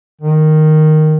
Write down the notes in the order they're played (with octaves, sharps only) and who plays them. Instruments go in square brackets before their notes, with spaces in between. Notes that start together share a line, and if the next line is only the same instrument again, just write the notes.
[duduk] D#3